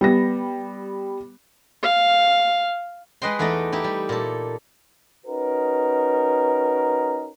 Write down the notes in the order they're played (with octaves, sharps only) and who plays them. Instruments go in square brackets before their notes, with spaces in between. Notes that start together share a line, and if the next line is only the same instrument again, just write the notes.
[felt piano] G3 B3 A#6
[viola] F5
[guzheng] G#3 B4 D#5 G5 C6
E2 A3 D#4 D5 D#5
D#4 E4 G4
G3
A#2 A4
[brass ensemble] C#4 D#4 F#4 A#4 B4